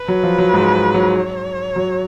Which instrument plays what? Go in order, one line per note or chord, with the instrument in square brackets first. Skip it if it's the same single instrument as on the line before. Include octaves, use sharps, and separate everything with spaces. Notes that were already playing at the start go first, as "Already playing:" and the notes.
Already playing: [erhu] B4
[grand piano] F#3
F3
F#3
G#2 G#3
F#3
[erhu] C#5
[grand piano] F#3